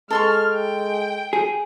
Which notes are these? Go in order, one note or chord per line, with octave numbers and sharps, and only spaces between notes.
G#3 A4 C6 C#6 F6
G5
G#4